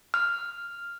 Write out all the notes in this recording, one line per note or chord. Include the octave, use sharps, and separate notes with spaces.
F6